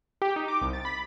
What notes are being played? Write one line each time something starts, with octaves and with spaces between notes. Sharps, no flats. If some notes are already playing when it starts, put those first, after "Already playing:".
G4
D#4
D6
C2
A6
B5